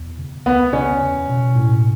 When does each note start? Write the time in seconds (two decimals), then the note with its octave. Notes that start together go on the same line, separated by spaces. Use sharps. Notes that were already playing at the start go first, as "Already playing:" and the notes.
Already playing: E2
0.19 C#3
0.46 C#2 B3
0.73 C#3 C#4
1.01 E2
1.29 B2
1.55 A2